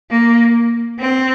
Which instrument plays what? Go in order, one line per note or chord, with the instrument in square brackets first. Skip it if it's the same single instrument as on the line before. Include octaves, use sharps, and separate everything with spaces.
[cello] A#3
C4